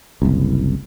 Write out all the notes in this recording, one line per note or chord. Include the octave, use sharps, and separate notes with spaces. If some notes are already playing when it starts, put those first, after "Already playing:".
F#1 C2